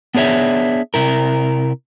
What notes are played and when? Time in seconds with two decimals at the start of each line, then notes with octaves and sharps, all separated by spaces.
0.15 B3 D4 G#4 C#5 E5
0.94 C3 E4 A#4